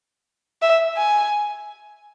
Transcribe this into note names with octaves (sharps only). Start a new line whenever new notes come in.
E5
G#5